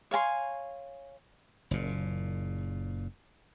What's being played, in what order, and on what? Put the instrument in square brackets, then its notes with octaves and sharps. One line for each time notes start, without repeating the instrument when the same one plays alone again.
[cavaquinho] C#5 F5 G#5 C6
[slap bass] F#1 A#2